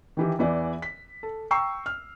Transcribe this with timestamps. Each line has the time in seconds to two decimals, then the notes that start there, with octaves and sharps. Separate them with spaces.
0.17 D#3 E3 G4
0.39 E2 E3 D5
0.82 B6
1.23 A4
1.51 G5 A#5 C#6 E6 C7
1.86 F6